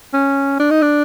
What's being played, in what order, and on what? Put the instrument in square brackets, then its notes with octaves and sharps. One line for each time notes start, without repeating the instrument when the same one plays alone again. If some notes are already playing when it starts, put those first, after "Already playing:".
[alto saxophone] C#4
D4
D#4
D4